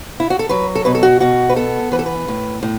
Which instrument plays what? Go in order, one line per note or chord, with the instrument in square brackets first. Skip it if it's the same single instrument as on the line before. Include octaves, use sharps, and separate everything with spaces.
[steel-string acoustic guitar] E4
F#4
A4
F#3 B4
A4
B2 B4
A4
F#4
B2 F#4
B4
B3 A4
E3 B4
A4
B4
A2
A2